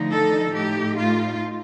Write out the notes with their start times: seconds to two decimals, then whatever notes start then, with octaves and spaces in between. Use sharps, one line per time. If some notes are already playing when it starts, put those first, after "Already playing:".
Already playing: D3 F3 A3 D#4
0.11 A4
0.54 A2 A3 D#4 G4
0.97 F4